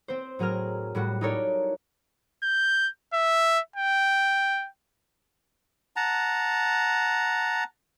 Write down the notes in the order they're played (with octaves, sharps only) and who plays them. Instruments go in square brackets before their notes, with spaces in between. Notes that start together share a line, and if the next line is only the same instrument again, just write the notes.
[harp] C4 C5
A2 F#3 G#4 A#4 F6
A2 G3 F#4
D#4 E4 A4 A#4 C#5 D5
[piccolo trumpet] G6
E5
G5
[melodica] F#5 A5 A#5